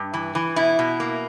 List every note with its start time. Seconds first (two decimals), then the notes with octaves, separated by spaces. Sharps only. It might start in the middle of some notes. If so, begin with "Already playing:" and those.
Already playing: G2
0.14 E3
0.35 E3
0.56 B2 E4
0.79 B2
1.00 A#3